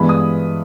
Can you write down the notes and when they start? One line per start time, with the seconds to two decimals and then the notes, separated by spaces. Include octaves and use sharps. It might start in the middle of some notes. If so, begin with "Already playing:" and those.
Already playing: G2 E3 G#3 B3 B5
0.09 D#6